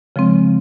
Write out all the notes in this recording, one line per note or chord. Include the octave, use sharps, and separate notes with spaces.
C#3 F3 G#3 C4